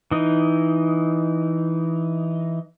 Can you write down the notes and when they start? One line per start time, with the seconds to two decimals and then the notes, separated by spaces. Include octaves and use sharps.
0.11 E3 D#4